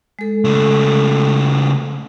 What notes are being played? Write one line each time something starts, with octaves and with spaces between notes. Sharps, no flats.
G#3 A4
C#3 A3